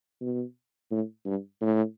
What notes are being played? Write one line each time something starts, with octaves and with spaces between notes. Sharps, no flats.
B2
A2
G2
A2